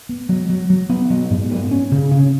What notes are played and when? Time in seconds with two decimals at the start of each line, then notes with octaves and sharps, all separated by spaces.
0.09 B3
0.29 F#3
0.50 F#3
0.70 F#3
0.90 B3
1.10 F#3
1.30 G#2
1.51 B3
1.71 C#4
1.92 C#3
2.11 C#4